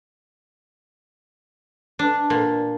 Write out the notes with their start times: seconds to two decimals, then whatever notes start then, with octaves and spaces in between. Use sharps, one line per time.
1.99 D4
2.30 A#2